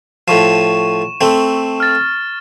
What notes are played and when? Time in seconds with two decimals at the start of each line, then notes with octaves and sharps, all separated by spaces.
0.28 A2 F3 C#6 E7
1.21 A3 C4
1.80 F6 A6